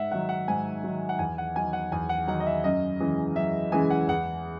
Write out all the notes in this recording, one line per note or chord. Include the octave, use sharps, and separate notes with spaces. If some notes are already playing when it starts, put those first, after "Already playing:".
Already playing: G#2 E5 F#5
D#3 F#3 F#5
F#5
G#2 G#5
D#3 F#3
F#5
E2 G#5
F#5
D#3 F#3 G#5
F#5
E2 G#5
F#5
D#3 F#3 F#5
D#5
E5
F#2 D#5
C#3 E3 G#3
F#2 E5
C#3 E3 G#3 G#5
F#5
E2 F#5